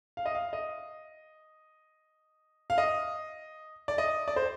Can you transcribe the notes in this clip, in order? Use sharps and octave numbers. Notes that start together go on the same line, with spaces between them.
F5
D#5
F5
D#5
F5
D#5
D5
D#5
D5
C5